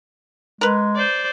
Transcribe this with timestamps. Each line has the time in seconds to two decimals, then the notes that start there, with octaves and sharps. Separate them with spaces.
0.61 G#3 A#4 B4
0.96 C5 D5